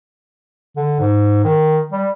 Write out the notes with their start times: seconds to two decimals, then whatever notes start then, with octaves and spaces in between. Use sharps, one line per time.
0.76 D3
1.00 G#2
1.44 D#3
1.92 G3